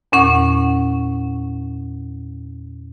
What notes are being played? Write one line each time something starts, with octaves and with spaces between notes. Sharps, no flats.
E2 A#2 C#4 F#5 C#6